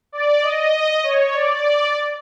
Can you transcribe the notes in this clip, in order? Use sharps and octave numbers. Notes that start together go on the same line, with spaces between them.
D5
D#5
C#5
D5